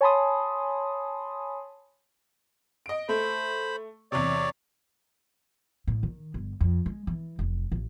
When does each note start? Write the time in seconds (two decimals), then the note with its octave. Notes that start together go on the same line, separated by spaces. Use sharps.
0.01 C#5 G#5 A5 B5 C6 D#6
2.86 D#5 D7
3.09 A3 C5 B5
4.12 E2 C3 C#5 D5
5.87 A2
6.03 D#3
6.34 G1
6.61 F2
6.86 G#3
7.07 E3
7.39 F1
7.72 A1